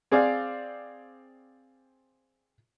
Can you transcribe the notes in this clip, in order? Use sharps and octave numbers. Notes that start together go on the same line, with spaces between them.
C4 G#4 C5 D5 F5